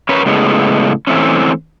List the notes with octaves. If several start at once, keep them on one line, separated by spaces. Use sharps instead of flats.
C#4 A#4 B4 C#5
A2 C#3 G#3 B3
E3 A3 C4 C#4